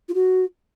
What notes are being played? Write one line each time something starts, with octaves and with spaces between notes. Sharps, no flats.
F4
F#4